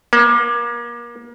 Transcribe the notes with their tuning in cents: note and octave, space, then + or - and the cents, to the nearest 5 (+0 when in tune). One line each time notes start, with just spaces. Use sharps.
A#3 +35